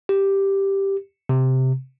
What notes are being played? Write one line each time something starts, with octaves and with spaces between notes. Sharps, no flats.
G4
C3